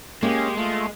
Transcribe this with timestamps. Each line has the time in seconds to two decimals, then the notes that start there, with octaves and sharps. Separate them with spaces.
0.23 G#3 A#3 C#4 G4
0.57 A3 F4